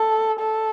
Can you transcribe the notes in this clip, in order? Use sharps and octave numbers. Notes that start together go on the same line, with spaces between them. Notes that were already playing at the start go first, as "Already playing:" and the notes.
Already playing: A4
A4